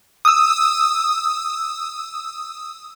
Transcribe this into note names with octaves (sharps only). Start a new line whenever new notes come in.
D#6 E6